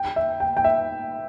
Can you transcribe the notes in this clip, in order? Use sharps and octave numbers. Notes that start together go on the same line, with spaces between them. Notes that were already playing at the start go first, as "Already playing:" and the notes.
Already playing: G5
E5
G5
G5
E5